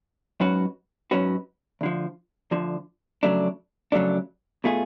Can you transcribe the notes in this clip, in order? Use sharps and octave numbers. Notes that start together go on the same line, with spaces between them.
G#2 F#3 C#4 F#4 B4
G#2 F#3 C#4 F#4 B4
D2 D3 F3
D2 D3 F3
F2 C#3 F#3 A3 D4
F2 C#3 F#3 A3 D4
B2 A3 F4 G#4